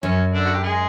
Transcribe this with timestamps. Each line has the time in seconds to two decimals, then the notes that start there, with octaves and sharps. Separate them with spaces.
0.03 F#2 C#4
0.33 D3 D4
0.45 F#4
0.54 G4
0.63 G#3 G#4